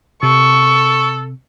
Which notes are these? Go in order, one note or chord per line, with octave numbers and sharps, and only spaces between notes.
C3 A4 C#6